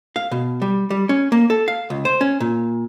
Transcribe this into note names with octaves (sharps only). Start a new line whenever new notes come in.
F5
B2
G3
G3
C#4
A#3
A4
F5
C#2
C5
C#4
A#2